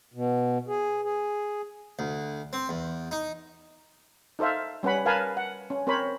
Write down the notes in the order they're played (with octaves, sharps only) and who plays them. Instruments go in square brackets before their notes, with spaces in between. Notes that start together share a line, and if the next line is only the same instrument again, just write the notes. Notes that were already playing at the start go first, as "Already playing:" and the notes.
[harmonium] B2
G#4
G#4
[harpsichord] D2
C4
E2
D#4
[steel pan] D#4 A4 C5 E5 F5
G3 C#4 B4 F#5 B5
A#4 B4 F5 G#5 A5 B5
F#5
C#4
C4 A#4 C5 C#5 B5